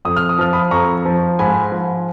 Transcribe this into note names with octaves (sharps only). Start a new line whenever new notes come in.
F2 D#6
F6
D#6
F3 F6
B5 D#6
F2 A#5 C#6
F3
G#2 G#5 B5
F3